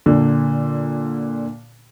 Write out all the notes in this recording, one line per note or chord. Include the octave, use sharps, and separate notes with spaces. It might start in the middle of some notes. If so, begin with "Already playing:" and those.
A#2 D3